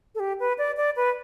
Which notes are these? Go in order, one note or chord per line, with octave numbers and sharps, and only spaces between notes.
A4
G4
B4
D5
D5
B4